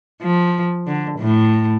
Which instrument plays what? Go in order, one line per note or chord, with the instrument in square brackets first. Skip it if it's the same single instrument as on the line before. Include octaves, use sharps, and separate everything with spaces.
[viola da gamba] F3
D3
A2